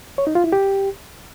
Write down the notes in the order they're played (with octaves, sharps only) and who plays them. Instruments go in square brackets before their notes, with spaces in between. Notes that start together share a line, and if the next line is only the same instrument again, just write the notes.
[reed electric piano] C#5
D#4
F4
E4
G4